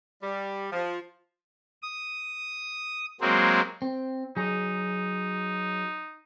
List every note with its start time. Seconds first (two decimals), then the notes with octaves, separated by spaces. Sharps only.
0.21 G3
0.71 F3
1.82 D#6
3.21 F#3 G#3 A#3 C4
3.82 C4
4.37 F#3 D#4 G#4